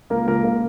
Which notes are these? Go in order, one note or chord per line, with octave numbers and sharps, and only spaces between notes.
C#2 A#3 A#4
C#2 A#3 A#4
C#3 A#3 A#4